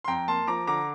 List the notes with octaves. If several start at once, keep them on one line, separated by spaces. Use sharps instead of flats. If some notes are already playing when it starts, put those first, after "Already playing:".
C6
F2 G5 A#5
A#3 A5 C6
F3 A#5 D6
D3 A#5 D6